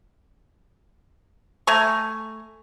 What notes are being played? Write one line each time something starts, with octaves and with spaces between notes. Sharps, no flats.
A3 G#5 A#5 C#6